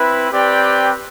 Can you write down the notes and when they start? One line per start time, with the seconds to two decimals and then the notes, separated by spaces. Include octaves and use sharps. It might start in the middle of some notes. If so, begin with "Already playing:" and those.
Already playing: C4 E4 B4
0.32 C4 G4 B4 D5 G5